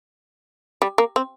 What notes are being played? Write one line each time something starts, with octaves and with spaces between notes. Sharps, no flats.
G3
A#3
C4